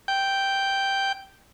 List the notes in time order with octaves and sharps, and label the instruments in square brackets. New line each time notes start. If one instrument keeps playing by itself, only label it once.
[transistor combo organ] G5